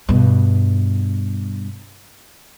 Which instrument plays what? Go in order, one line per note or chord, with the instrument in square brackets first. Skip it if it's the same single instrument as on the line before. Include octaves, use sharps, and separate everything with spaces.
[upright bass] G2 B2